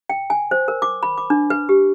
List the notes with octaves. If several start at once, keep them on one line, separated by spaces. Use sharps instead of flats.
G5
G#5
C5
A#4
D6
B5
D6
D4
B4
G4